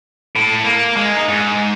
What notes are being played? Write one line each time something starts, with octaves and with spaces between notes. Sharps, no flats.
A2
A#3
G#3
D#4
G#2